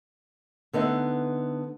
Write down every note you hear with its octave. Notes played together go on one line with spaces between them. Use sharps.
D3 B3 D#4 B4 E5